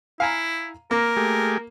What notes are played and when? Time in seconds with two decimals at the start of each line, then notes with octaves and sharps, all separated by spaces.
0.20 E4 F5 G#5 A#5
0.91 A#3 A#4
1.16 A3 G4 G#4